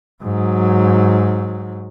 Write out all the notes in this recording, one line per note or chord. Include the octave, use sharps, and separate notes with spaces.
G#2 F#3